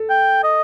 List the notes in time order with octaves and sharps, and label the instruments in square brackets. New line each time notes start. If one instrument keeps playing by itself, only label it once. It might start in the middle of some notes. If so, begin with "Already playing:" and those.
Already playing: [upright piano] A4
[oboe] G5
D#5